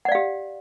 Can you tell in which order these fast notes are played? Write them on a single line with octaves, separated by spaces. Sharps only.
F#5 D5 F5 G4